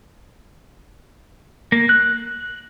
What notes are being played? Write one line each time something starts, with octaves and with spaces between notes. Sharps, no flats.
A#3
F#6